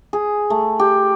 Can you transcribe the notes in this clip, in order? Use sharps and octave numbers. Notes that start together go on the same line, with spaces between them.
G#4
A3
G4